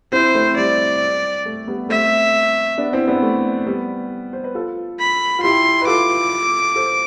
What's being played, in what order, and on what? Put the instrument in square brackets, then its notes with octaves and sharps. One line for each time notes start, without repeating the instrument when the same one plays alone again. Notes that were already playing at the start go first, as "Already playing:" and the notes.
[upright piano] C4 E4 [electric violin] C5
[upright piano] A3 C4
[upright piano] G3 [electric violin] D5
[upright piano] A3
G3 B3
[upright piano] A3 C4 [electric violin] E5
[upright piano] B3 D4
C4 E4
B3 D4
A3
G3 B3
C5
B4
F4 A4
[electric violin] B5
[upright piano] F4
[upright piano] E4 G4 [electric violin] C6
[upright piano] B4
[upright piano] F4 A4 [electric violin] D6
[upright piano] A4 C5